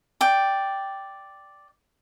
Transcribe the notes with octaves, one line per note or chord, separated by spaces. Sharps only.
D5 G5